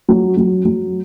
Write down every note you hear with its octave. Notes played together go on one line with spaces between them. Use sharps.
F#3
F#3
F#3